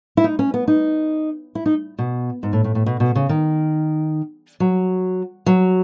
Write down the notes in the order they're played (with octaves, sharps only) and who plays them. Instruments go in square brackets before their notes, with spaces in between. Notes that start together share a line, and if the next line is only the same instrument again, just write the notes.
[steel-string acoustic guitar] E4
D#4
C#4
B3
D#4
E4
D#4
B2
G#2
A2
A2
A2
B2
B2
C#3
D#3
F#3
F#3